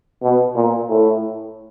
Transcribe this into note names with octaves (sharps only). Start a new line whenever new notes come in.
B2
A#2
A2